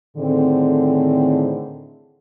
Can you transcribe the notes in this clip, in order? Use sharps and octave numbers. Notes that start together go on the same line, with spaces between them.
A2 D3 D#3 C4 G#4